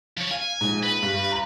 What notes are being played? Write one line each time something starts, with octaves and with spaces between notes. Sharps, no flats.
F3 C#5
F5 G#5
A#1 G#2
B4
G2
A#5 B5